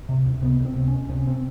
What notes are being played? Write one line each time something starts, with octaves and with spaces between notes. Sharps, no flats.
C3
C#2
C3 B3
C#2
C4
C3
C#4
C#2
C3 C#4
C4